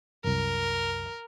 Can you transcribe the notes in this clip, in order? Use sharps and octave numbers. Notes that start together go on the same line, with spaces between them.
C2 F#2 A#4